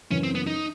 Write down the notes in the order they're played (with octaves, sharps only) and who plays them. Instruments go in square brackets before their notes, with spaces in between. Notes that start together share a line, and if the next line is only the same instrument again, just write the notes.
[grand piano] F#2 C#3 E3 [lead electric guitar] C#4
[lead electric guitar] C4
B3
D#4